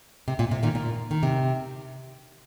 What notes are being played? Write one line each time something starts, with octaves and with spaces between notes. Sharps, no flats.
C3
A#2
C3
A#2 D#3
A#2
D#3
C3